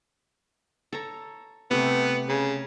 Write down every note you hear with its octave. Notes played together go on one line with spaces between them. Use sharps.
A4 C#5 A#5
C3 A3 B3 C4
C#3